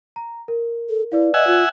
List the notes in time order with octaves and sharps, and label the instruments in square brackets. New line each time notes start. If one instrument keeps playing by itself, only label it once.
[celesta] A#5
A#4
[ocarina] A4
[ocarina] E4 [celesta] B4 D5 F5
[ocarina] D#5 [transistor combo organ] E5 F#5 G#5
[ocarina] F4